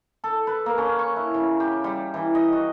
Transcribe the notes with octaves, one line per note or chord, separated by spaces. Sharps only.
A4
B4
A#3
C#4
C#6
E4
C#3
G4
G3
E3
D#5
F#4